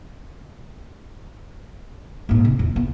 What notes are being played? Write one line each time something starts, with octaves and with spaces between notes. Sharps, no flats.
A#1 G#2
C3
E2
A2 B3